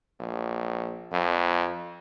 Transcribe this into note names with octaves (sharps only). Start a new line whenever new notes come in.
A#1
F2